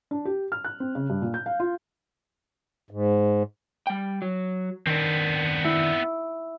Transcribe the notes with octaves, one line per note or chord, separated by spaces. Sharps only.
D4
G4
F6
F#6
C4
C#3
G2
A#2
G6
F5
F4
G#2
G3 G5
F#3
D#3 B3 C4 D4
E4